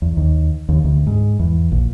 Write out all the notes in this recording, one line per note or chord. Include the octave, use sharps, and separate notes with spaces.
E2
D#2
D#2
D2
G#2
E2
A#1